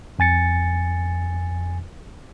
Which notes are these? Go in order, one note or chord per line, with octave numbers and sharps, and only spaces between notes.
F2 G#5 A6 C#7